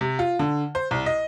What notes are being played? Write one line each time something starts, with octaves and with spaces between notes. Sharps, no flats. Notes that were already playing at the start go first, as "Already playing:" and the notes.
C3
F4
D3
C5
C2
D#5